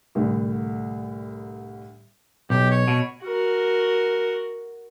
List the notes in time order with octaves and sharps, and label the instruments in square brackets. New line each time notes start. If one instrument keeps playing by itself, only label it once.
[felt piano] C2 A2 D3
[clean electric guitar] B1 [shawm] G4
[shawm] C#5
[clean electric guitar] B2
[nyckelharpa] F#4 A#4